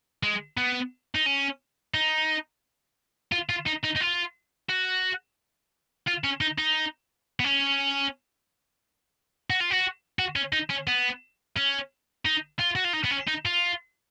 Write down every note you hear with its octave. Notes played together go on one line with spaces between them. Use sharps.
G#3
B3
D#4
C#4
D#4
F4
F4
D#4
D#4
D#4
F4
F#4
F4
C#4
D#4
D#4
B3
C#4
F#4
F4
F#4
F#4
C#4
D#4
C#4
B3
C#4
D#4
F4
F#4
F4
D#4
B3
C#4
D#4
F4